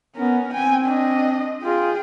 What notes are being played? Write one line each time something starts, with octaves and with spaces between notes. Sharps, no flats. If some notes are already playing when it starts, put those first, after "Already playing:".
B3 C#4 A#4
C4 G5 G#5
D4 D#5
F4 G#4 G5